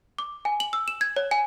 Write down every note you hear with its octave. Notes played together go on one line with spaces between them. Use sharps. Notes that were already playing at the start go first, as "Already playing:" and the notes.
D6
G#5
F#7
E6
E7
G#6
C#5
G#5